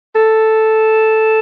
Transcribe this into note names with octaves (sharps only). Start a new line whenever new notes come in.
A4